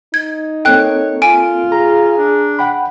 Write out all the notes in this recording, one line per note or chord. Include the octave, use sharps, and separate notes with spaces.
D#4 G#6
A#3 C4 A4 C#5 G5 F#6
F4 G#5 D7
G#4 A#5
D4
F#5 G5 B5